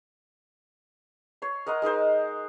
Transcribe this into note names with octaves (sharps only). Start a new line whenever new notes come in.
C#5 C6
A#4 D#5 F#5 C6
G#3 D#4 A#4 C5